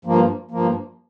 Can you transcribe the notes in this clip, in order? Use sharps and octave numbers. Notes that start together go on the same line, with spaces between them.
G2 F3 A#3
G2 F3 A#3